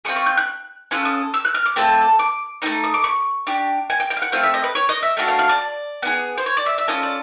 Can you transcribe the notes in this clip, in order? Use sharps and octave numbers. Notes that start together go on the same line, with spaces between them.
C4 F4 G#4 C#6
C#6
G6
F#6
C#4 F4 A4 F#6
D#6
E6
F#6
F6
D6
A3 C4 F4 A4
D6
A3 C4 D#4
D#6
D6
C#6
D4 G4
G#5
G5
G5
F5
F#5
A3 C4 F4 F5
E5
D#5
B4
C#5
D#5
E5
A3 D4 F#4 F5
F5
F5
D5
B3 E4 G#4
C5
C#5
D5
E5
E5
C#4 F4 A4 D#5
D5